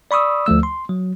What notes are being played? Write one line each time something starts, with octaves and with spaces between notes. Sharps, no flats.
D5 B5 C#6 D#6 E6
D2 F3 A3 E6
C6
F#3